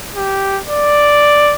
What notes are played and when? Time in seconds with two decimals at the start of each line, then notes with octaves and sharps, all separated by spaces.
0.16 G4
0.66 D5